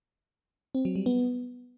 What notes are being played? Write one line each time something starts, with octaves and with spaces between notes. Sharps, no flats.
C4
F#3
G3
B3